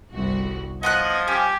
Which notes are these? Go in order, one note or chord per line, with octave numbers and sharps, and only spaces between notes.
G1 C2 F#4
F3 B3 D#5 B5 F#6 G#6
C#4 G4